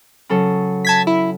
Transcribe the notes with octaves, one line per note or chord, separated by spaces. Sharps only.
C#3 F#3 A4
A5 G#6 B6
E4